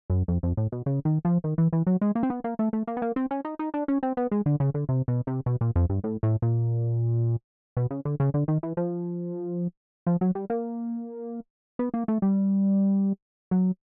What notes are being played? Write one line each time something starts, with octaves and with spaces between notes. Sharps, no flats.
F#2
F2
F2
A2
B2
C#3
D#3
F3
D#3
E3
E3
F#3
G#3
A#3
C4
B3
A#3
A3
A3
A#3
B3
A#3
C4
C#4
D#4
D#4
D4
C#4
C4
B3
G#3
D3
C#3
D3
C3
B2
C3
B2
A#2
F2
G2
A2
A2
A#2
B2
C#3
D3
C#3
D3
D#3
E3
F3
F3
F#3
G3
A#3
B3
A#3
A3
G3
F#3